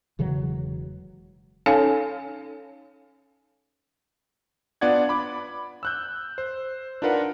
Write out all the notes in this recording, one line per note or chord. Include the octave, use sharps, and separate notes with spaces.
E1 C#3 E3 F#3
C#4 D#4 A4 C#5 F5 G#5
B3 D4 F4 D5 F#5 G#6
B5 D6
E6 F#6 G6
C5
D4 D#4 F4 A#4 B4 F#5